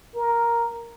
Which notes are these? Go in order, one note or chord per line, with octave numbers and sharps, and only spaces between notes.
A#4